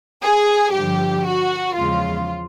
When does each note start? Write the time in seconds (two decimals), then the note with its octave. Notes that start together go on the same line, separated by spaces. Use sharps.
0.22 G#4
0.72 G2 D3 F3 G4
1.25 F#4
1.75 E2 C#3 F3 G#3 F4